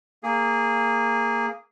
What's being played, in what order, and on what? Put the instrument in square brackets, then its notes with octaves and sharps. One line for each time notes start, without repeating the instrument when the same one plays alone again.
[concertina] A#3 G#4